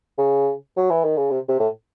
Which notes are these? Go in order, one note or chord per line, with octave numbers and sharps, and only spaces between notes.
C#3
F#3
E3
D#3
C#3
C3
C3
A2